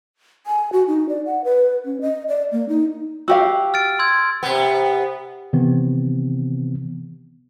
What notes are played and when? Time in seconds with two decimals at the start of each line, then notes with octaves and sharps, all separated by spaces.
0.46 G#5
0.73 F#4
0.88 D#4
1.09 D5
1.26 F#5
1.44 B4
1.85 C#4
2.01 D#5
2.28 D5
2.52 A#3
2.69 D#4
3.28 F#4 G4 F5 E6
3.74 F6 A6 D7
3.99 C6 E6 G#6
4.43 C3 B3
5.53 C3 D#3 E3 B3 C4